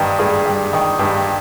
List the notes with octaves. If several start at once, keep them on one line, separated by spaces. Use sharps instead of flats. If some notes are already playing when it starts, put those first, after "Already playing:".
Already playing: G2 D#3 G3 G4
G2 G#4
G3
D#3
G2 G4